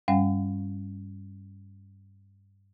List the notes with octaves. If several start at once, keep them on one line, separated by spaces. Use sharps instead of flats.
G2 G3 C#4 F5 F#5